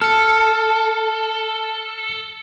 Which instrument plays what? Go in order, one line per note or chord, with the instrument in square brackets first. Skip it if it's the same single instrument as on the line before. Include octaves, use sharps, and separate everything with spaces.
[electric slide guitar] A4 [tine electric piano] F6 C#7